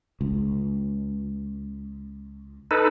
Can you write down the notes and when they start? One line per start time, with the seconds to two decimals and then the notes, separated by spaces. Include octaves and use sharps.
0.21 C#2
2.71 D#4 A4 B4